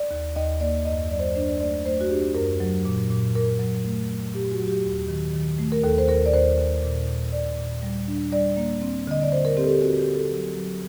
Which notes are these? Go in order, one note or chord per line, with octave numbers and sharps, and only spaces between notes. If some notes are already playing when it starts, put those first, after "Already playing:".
Already playing: D5
D#2
D#2 D#5
A#3 D5
F#2 D#5
F#3 D5
C5
D5
D4 C5
D5
A3 D5
A3 C5
F#4
D4 G4
F#2 A#4
F#3
A#2
A#2
A#2 A#4
F#3
A3
F#3
A#2 G4
F#4
F#3
G4
D#2
D#3
D#3
A3
A#4
D#2 A4
C5
D#2 A#4
D5
D#2 C5
D#2
A#2
A#2
A#2 D5
A#2
G3
D4
G3 D5
A#3
C4
D3 D#5
D5
D3 C5
A#4
C4 G4
A4
G4
C4 F#4
G4
D3
A4
F#3
F#3